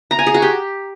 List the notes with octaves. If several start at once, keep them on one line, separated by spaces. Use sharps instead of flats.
A#5
G#5
G#4
F#4
G4